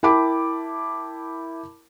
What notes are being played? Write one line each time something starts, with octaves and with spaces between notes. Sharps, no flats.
E4 A#4 G5 A5 B5 D6